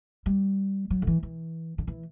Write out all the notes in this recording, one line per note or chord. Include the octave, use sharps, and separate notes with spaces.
G3
F#3
D3
E3
E3
D3
E3